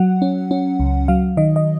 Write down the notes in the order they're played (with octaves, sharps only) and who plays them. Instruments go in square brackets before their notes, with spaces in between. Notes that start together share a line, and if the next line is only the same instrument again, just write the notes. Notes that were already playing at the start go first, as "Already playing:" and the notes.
Already playing: [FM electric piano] F#3 F#5
C#4
C#4
C#2
F#3 F5
D#3 D#5
D#5